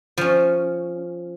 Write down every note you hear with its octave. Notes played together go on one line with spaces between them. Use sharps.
F3 C#4